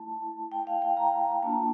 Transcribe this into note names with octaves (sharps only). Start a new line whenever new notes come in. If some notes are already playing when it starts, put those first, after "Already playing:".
Already playing: A3 E4 A5
G5
F5
G5
A#5
A#5
A#3 D4 F4 A5